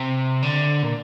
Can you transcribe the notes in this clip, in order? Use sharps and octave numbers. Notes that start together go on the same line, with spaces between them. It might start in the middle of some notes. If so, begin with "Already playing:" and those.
Already playing: C3
D3
A#2